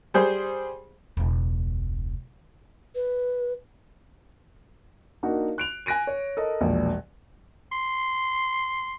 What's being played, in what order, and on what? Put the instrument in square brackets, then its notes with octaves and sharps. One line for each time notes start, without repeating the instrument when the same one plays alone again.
[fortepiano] G3 G#4 C5
[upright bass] E1 C#2
[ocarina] B4
[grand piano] A#3 D4 D#4 F#4
F#6 D7 F7
G#5 F#6 A#6 D7 D#7
C#5
A4 A#4 D#5
E1 A#1
[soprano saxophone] C6